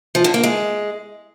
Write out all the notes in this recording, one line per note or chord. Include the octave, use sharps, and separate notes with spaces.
F3
D3
A#3
G#3